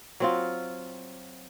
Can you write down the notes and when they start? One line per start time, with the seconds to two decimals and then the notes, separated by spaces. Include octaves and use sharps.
0.20 F#3 C4 F4